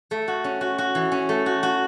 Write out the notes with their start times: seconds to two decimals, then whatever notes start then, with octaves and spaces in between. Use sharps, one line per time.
0.11 A3
0.28 F#4
0.44 C#4
0.61 F#4
0.78 F#4
0.95 E3
1.12 C#4
1.29 A3
1.46 F#4
1.63 F#4